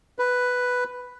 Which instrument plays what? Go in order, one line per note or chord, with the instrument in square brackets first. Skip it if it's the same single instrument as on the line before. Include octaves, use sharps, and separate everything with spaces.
[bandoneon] B4